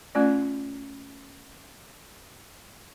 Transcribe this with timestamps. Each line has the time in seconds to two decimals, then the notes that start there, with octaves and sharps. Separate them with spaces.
0.15 A3 C#4 F4 D5